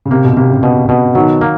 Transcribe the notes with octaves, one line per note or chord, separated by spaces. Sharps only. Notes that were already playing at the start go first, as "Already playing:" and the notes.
C#3
C3 A#3
B2
C3 A#3
C#3
B2
B2
D#3 F#3
A#3